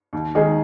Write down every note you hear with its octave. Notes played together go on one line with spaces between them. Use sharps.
D#2
D#3 G#3 D#4 G#4